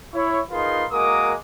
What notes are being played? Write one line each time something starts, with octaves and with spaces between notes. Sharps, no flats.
E4 C#5
D#4 F4 G#4 A#4 B4 C6
G#3 A#3 F#4 A#4 D6 D#6